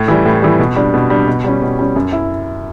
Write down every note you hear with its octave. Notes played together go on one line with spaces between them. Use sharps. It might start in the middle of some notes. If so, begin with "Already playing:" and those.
Already playing: A2
E3 G3
A2
E3 G3
B2
G3 D4
B2
G3 D4
B2
G3 C#4
B2
G3 C#4
F#2
E4